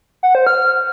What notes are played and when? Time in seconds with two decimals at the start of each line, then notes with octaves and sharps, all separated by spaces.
0.23 F#5
0.35 C5
0.47 F6